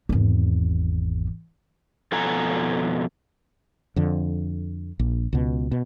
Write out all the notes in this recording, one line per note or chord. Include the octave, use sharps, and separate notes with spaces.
G#1 E2
F2 B2 A4 F#5 G#5 A#5
F2 D3
A#1
C#2 B2
B2